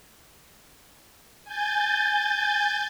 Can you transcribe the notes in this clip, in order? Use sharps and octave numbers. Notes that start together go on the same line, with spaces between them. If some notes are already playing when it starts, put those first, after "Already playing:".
G#5 G6 A6